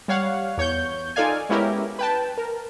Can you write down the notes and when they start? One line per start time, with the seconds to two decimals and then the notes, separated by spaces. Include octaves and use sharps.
0.08 G3 C#5 F5 F#5
0.57 E2 C#5 C#6 G6
1.16 D#4 F4 A4 D5 F5 G#5
1.49 G#3 B3 C#4 E4 G4 A#4
1.99 B4 G5 A5
2.38 A#4